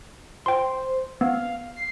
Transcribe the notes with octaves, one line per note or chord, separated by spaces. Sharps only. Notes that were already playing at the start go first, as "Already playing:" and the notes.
C5 G5 C6
B3 F5
C7